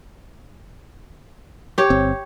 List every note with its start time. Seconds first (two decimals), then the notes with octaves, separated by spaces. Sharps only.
1.78 G4 C#5
1.90 G1 C4